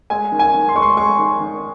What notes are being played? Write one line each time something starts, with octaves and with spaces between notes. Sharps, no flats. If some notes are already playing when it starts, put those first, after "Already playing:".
G#3 G#5
D#3
G#5
D#3
C6
G#3 C#6
C6
G#3 C#6
D#3
D#3